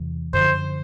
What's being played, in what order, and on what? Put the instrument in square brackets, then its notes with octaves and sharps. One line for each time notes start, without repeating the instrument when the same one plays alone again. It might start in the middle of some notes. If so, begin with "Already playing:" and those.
Already playing: [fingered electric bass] E2 C3 E3
[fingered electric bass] F#2 D3 F3 [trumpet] C5